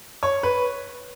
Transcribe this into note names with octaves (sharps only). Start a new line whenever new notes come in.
C#5
B4